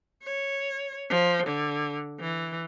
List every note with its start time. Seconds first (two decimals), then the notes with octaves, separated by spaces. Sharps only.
0.23 C#5
1.10 F3
1.46 D3
2.20 E3